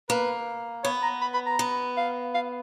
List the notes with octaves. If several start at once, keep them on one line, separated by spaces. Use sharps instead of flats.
A#3 B4
B3 C#5
A#5
B5
B5
A#5
B3
F5
F5